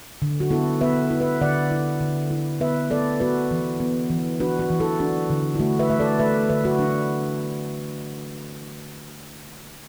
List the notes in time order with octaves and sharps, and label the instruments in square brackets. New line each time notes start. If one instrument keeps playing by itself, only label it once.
[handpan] D3
F#4
B3 E4 A4
B3 B4 E5
E4
B4 E5
D3 D5 F#5
E4
D3
E4
B3 B4 E5
B3 A4 D5
B3 F#4 B4
E3
B3
E3
D4 F#4 B4
F#4
E3
E4 A4
D4 F#4
D3
E4
A3 F#4
B4 E5
A3 E5
A4 D5
A3 B4 E5
D3 B4 E5
F#4 B4
D4